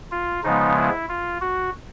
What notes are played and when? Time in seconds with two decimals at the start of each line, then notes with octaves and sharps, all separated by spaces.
0.11 F4
0.44 C#3 F3 G#3 B3 D#4
0.77 E4
1.09 F4
1.41 F#4